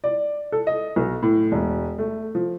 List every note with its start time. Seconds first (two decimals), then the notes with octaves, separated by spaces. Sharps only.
0.04 D5
0.52 A4
0.67 D#5
0.96 B1
1.23 A2
1.52 E1
1.98 A3
2.35 F3